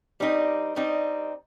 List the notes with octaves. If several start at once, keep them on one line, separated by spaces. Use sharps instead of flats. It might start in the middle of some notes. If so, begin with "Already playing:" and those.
G3 C4 D#4
G3 C4 D#4